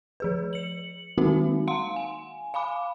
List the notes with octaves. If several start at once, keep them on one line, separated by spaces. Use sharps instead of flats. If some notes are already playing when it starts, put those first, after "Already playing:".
F3 G#4 B4
C#7 F#7
D#3 G#3 A#3 C4 D#4 F#4
F5 F#5 C6
G#5
F5 G#5 B5 D6